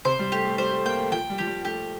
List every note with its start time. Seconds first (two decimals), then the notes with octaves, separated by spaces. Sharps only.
0.05 C3 C5
0.19 G3
0.32 A3 G4
0.45 A3
0.58 G3 C5
0.72 A3
0.85 A#3 G5
0.99 A3
1.12 F3 G5
1.30 G3
1.38 F3 G4
1.47 G3
1.65 A3 G4